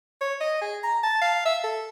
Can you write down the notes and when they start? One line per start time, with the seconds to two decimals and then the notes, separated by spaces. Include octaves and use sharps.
0.21 C#5
0.41 D#5
0.61 G#4
0.83 A#5
1.03 A5
1.22 F5
1.46 E5
1.64 A4